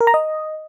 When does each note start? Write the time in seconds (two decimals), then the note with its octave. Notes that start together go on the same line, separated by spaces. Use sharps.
0.01 A#4
0.07 A#5
0.14 D#5